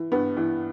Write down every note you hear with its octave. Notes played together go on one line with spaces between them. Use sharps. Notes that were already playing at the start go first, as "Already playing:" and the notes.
Already playing: E3
G2 B3
E3